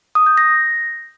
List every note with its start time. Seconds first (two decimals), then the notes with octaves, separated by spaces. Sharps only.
0.15 D#6
0.26 G6
0.38 A#6